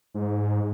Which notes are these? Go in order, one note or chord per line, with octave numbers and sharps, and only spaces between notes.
G#2